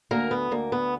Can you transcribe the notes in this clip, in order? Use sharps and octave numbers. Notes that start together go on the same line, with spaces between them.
D2 A#3 A#4
B3
D2 A#3
B3